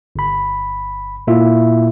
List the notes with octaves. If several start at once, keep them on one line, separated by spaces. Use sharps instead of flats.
G1 B5
A#2 A#3 E4 F4 E5